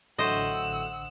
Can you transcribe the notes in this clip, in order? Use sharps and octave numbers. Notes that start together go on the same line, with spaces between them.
A1 A2 D3 F#3 C5 D#5 F#5 E6